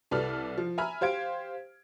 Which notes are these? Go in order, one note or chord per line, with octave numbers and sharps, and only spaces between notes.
C2 A4 B4 D5 F6
F3
E5 G#5 A#5 B5 F6
G4 C5 F5 G#6 D7